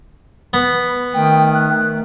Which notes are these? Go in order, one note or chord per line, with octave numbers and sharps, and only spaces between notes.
B3
B5
D#3 A3 G5
F#6